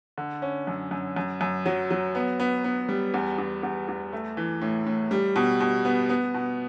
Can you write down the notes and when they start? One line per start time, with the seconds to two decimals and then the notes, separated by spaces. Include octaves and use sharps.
0.18 D3
0.42 C#4
0.67 F#2
0.91 F#2
1.16 F#2
1.41 F#2
1.66 F#3
1.91 F#3
2.15 B3
2.40 B3
2.64 B3
2.89 G3
3.14 E2
3.38 E2
3.63 E2
3.88 E2
4.13 A3
4.37 E3
4.61 A2
4.86 A2
5.11 G3
5.36 B2
5.60 B2
5.85 B3
6.09 B3
6.34 B2